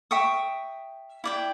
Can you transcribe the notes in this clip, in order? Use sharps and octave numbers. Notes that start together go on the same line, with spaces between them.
E5 G5 C#6 D#6
E4 D5 G5